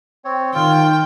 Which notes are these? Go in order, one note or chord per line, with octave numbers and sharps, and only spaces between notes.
C4 C#5
D#3 F4 G5